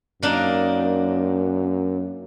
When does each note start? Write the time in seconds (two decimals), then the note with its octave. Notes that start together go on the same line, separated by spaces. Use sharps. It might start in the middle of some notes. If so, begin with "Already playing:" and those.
0.23 F#2 A#3 D4 D#4